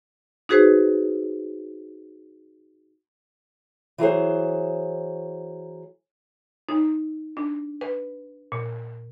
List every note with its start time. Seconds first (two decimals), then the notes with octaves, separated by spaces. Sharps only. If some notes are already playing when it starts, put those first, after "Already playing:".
0.49 D#4 F#4 G#4 B4 C5
3.98 E3 F#3 G#4 C5
6.69 D#4
7.37 D4
7.81 B4
8.52 A#2